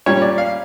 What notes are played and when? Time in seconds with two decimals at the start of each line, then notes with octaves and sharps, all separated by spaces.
0.06 A#2 G3 C#4 C#5
0.22 D5
0.38 F5